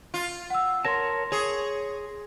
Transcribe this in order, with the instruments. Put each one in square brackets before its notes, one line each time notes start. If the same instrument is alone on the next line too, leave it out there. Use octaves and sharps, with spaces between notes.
[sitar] F4
[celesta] F#5 E6
[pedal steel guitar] A#4 C#5 A5 [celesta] C6 A#6
[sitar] G#4 [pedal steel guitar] C#5 C#6